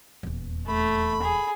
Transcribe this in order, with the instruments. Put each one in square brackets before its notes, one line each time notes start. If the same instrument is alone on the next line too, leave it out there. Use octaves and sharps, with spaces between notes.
[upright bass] D#1 E2
[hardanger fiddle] A3 [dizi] B5
[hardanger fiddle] G#4